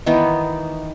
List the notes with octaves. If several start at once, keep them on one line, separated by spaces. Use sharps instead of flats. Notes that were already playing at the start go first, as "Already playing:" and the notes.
D#3 E3 B3 D#4